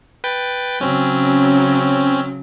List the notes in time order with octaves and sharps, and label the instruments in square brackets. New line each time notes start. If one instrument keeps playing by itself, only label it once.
[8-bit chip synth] B4 G5 A6
[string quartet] C#3 F#3 [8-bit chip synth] C4 C#4